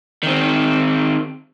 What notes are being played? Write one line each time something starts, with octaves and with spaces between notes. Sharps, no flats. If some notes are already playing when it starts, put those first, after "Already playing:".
D#3 C4